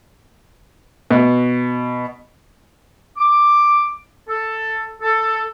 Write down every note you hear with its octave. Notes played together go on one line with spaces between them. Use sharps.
B2
D6
A4
A4